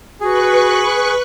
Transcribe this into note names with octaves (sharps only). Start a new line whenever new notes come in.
F#4 G#4 B4 C#6 F#6